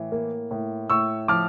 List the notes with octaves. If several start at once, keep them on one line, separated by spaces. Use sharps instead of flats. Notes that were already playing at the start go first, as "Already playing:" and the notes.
Already playing: A2 E3
A#3
A2
A2 C#6 E6
F3 D6 F6